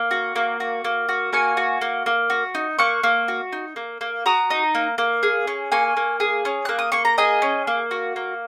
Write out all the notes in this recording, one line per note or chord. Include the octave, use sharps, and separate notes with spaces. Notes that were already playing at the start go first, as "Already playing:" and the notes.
Already playing: A#3
F#4
A#3
F#4
A#3
F#4
A#3 G#5 C#6
F#4
A#3
A#3
F#4
D#4
A#3 C#6 F#6
A#3
F#4
D#4
A#3
A#3
F#4 A#5 D#6
D#4
A#3
A#3
G#4
C#4
A#3 G#5 C#6
A#3
G#4
C#4
A#3 F#6
D#6
A#3 C#6
A#5
G#4 D#5 G#5
C#4
A#3
F#4
A#3